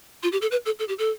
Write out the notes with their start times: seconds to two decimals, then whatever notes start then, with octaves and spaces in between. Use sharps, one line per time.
0.23 F4
0.32 G4
0.42 A4
0.51 B4
0.66 A4
0.79 A4
0.88 G4
0.99 A4